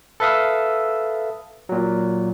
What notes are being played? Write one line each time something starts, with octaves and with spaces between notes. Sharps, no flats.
A4 B4 E5 F5 D#6
A#2 F#3